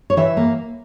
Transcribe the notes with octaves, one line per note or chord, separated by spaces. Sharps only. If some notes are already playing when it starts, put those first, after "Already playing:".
C#5
E3 E5
A#3